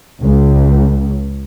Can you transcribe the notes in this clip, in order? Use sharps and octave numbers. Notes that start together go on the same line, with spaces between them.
C#2